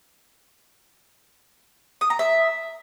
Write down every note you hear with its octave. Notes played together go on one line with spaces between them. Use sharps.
D#6
A#5
E5